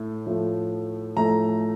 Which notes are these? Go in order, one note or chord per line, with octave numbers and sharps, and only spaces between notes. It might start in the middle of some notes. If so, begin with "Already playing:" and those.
Already playing: A2 A3
A2 F3 A3
A2 F3 A3 A#5